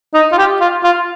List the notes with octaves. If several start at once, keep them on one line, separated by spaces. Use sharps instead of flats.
D#4
F4
G4
F4
F4